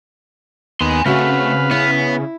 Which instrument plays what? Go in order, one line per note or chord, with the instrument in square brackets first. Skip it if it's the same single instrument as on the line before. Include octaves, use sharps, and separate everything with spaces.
[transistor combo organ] D#2 B3 [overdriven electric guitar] G#5 C6
[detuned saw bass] C#3 [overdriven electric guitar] A3 [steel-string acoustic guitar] C4 C#4 F#4 [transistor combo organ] B4 F5
[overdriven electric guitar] B3 [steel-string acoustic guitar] E4